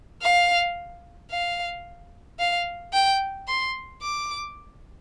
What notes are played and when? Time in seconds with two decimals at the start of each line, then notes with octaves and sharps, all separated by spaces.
0.22 F5
1.30 F5
2.39 F5
2.93 G5
3.48 C6
4.02 D6